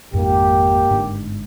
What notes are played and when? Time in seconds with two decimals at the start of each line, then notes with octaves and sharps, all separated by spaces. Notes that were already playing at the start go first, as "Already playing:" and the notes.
0.13 G#1 F2 G#2 A#3 G4
0.90 G1 G#2 D4